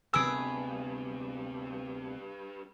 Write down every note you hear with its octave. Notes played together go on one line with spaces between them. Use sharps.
D2 G2 C3 B3 G#4 B4 E6 D7